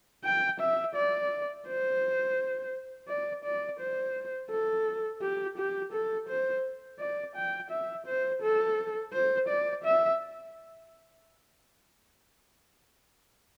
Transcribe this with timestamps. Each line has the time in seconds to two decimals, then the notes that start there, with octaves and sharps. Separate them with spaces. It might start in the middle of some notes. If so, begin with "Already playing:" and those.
0.25 G5
0.60 E5
0.95 D5
1.67 C5
3.08 D5
3.44 D5
3.79 C5
4.50 A4
5.22 G4
5.57 G4
5.93 A4
6.28 C5
6.99 D5
7.36 G5
7.71 E5
8.07 C5
8.43 A4
9.13 C5
9.48 D5
9.84 E5